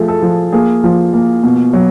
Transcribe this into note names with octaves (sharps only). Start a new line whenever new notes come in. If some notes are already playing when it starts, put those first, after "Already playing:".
Already playing: F3 A3 G#4
A4
F3
A#3 G#4
F3
A#3
B2
F#3